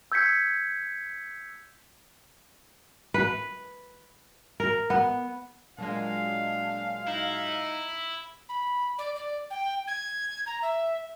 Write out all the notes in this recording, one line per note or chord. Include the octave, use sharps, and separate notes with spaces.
E6 G6 G#6 B6 C#7
B4
A#4
B3
A#2 F#3 G#3 D4 F5
D#4 E4
B5
D5
D5
G5
G#6
A#5
E5